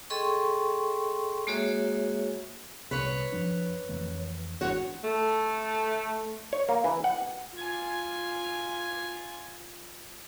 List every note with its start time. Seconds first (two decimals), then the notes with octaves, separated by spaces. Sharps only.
0.10 G#4 A4 D#5 G5 C6 C#6
1.47 G#3 A#3 F#4 G#4 C#5 E5
2.91 C2 B4 C#5
3.32 F#2 F3 D4
3.89 F2 E3 A3
4.61 G#1 E3 D4 F#4 C#5
5.04 A3
6.53 C#5
6.69 A#3
6.84 E3
7.04 F#5
7.55 F4 G#5